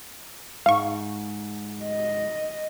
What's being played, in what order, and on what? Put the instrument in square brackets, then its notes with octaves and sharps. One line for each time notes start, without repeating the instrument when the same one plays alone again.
[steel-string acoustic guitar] G#2 [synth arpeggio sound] F5 C#6
[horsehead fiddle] D#5